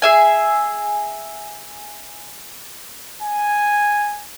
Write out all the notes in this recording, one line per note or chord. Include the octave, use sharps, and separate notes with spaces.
G#4 E5 G#5
G#5